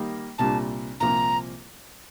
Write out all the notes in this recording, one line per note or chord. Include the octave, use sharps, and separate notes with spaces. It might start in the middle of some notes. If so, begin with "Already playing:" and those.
Already playing: D#3 G3 A#3
C2 A#2 G3 D4 A5
C2 A#2 F3 A#3 A#5